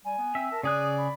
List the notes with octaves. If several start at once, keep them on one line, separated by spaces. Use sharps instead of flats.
G3 G#5
B3
C4 E5
A#4 A5
C#3 G#4 D5 D#6 F#6
B5